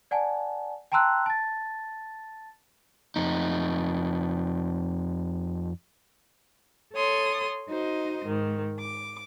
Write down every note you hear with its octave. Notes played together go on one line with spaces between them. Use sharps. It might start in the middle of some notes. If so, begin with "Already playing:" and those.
D5 F#5 G#5 A5
G5 A5 A#5 C6 E6 F#6
A5 A6
F2 D#4
A4 C#5 C6 D#6
D#4 F#4 C5 D#5
G#2 D#3
D6